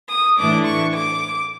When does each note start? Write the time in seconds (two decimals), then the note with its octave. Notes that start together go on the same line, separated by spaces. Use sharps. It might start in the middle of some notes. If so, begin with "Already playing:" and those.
0.08 D#6
0.37 A2 E3 A3 D4 D6
0.65 C#6
0.93 D6